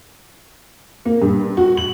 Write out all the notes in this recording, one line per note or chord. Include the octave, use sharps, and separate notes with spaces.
A#3
G2
F#4
F#7